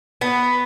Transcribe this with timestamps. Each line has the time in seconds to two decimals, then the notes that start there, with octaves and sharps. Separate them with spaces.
0.21 B3